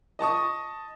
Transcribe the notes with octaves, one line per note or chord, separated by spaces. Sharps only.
D#5 A5 C#6 D#6